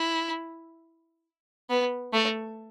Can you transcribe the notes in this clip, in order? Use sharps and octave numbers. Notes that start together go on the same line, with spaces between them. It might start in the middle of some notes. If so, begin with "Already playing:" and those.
Already playing: E4
B3
A3